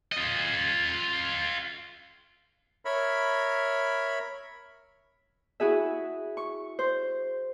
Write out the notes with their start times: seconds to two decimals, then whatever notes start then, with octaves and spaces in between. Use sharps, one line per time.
0.12 F4 D#5
2.85 A#4 C#5 E5 B5
5.60 E4 F#4 G#4 E5
6.37 C#6
6.79 C5